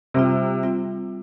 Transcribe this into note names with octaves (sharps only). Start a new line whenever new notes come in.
C3 G3 C4 F4
G3 C4 F4